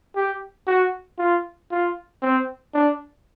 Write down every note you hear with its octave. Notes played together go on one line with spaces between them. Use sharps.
G4
F#4
F4
F4
C4
D4